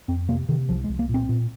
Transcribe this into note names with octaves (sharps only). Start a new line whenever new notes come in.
F2 C4
C3 A#3
C3 D#3
C2 F3
G#3
C2
A#3
A#2
C4
A#2